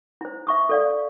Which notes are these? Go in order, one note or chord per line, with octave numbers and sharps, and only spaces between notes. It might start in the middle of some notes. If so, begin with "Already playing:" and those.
E4 C5
E5 C#6 D#6
A4 D5 F5